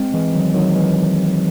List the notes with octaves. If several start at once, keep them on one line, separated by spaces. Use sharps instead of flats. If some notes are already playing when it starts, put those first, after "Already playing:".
Already playing: G#3 C4
E3 G#3
D#3 F#3
D#3 F#3
E3 G#3